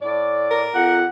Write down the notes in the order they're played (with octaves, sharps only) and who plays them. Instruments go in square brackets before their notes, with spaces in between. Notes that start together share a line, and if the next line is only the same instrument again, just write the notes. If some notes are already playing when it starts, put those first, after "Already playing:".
[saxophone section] A2 D5
[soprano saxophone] A#4
[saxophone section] F2 G4 F#5